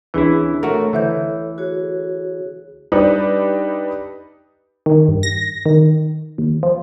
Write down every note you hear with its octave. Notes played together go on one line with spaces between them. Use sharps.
D2 E3 C#4 D4 E4 G#4
A3 F#4 A4 A#4 C#5
D3 E3 E5 G6
F#4 G#4 C#5
G3 D4 D#4 G4 B4
D#3
G2
A#6
D#3
D#2
F3